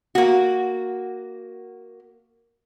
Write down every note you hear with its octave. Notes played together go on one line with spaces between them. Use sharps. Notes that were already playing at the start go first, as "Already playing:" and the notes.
A#3 F#4